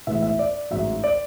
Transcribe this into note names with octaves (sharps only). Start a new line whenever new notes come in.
B1 A2 E3 G#3 E5
E5
D5
A1 G#2 F#3 E5
D5